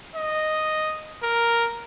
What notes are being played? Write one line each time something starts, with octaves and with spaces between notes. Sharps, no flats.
D#5
A#4